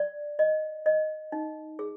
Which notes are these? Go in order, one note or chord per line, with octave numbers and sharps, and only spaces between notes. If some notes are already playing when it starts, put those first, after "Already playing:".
Already playing: D5
D#5
D#5
D#4
G#4